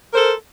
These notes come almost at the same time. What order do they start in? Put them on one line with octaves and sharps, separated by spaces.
A#4 C5 A4